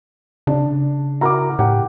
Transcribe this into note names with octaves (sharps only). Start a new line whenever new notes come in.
C#3 D4
E4 F#4 A#4 A#5 D6
A2 G4 F#5